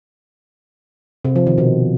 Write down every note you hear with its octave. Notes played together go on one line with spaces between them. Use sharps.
C3
F3
D#3
B2